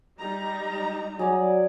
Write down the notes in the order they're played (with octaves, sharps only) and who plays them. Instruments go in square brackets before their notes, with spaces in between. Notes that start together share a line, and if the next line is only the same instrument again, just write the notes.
[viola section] G3 D#4 A#5
[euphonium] F#3 [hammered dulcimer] G#4 D5